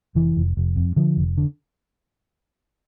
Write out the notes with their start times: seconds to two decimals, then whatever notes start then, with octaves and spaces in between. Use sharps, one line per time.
0.15 F1 E3
0.37 F1
0.57 F1
0.76 F2
0.96 D3 F3
1.17 F1
1.38 D3